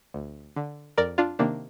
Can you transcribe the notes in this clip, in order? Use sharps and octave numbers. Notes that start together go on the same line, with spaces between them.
D2
D3
F2 A#4 D5
D4 F4
C3 D#3 A#3 D4